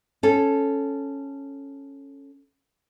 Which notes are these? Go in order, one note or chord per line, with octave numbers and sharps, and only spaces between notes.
C#4 A4